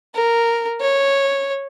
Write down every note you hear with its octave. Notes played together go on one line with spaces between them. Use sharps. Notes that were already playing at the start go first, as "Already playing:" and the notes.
A#4
C#5